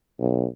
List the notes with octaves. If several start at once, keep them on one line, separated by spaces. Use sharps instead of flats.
B1